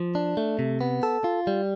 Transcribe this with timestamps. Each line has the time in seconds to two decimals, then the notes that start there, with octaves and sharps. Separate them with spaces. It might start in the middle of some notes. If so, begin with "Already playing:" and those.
Already playing: F3
0.15 D4
0.37 A3
0.59 C3
0.81 B3
1.03 A4
1.24 F4
1.47 G3